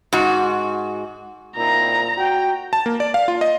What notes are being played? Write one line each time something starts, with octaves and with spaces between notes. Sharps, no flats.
G#2 F#4
A#2 C4 D#4 E4 A#5
F#4 G5
A5
A#3
D5
F5
F4
D#5